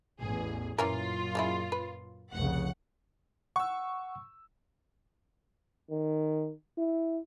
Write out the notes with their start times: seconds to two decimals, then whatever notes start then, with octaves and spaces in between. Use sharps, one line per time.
0.20 A1 E2 G#4
0.78 F#2 A#2 E3 C#4 F4 A#4
1.35 C#3 G#3 E4
1.72 B4
2.34 F1 C2 C#3 F#5
3.56 F#5 C#6 E6
5.91 D#3
6.78 E4